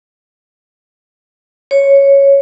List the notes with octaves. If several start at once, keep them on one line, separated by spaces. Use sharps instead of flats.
C#5